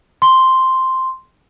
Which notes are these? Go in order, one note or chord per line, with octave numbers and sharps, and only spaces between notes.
C6